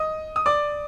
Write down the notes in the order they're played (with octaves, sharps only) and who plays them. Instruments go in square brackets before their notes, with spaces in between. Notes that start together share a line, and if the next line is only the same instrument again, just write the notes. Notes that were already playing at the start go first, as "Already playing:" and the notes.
Already playing: [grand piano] D#5 D#6
D#6
D5 D6